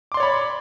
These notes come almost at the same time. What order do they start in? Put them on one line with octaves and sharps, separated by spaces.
D6 C6 D5 C#5 B5